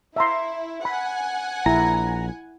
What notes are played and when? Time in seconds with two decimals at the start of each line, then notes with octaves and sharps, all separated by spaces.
0.16 E4 E5 A#5 C6
0.85 F#5 G#5 B5
1.66 A#1 E4 A#5